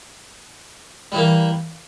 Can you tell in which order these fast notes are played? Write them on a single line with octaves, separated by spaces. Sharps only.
G3 E3 A#3